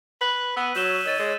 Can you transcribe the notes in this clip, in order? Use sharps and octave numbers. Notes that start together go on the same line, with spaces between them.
B4 F#6 B6 F#7
B3 E6 D#7
F#3 C#5 G6 E7 G7
D#3 E6 A6 D#7
G#3